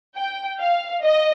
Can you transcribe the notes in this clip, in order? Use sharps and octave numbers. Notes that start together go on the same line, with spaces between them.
G5
F5
D#5